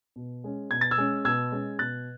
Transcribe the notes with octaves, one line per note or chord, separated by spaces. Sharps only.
B2
G#3 C#4
B2 G#6
A6
E6 G#6
G#3 C#4
B2 E6 G#6
G#3 C#4
B2 F#6 A6